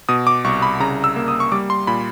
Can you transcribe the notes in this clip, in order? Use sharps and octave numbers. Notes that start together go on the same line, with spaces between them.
B2 D#6
D6
C2 C#6
B5
C#3 A#5
E6
A#3
D#6
C#6
G3 D6
C6
A#2 B5